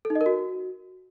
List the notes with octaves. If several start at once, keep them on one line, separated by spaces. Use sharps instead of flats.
A4
D#4
D#5
A#4
F#4